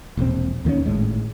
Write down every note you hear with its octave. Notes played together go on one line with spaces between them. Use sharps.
E1 A#1 B2 C4
D#2 D#3 F3 C#4
G#1 A2 G#3